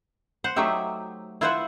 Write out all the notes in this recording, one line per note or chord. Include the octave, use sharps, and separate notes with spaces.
C5 F#5
F#3 A3 D#4 G4 E5
E4 F4 B4 C5 E5 F#5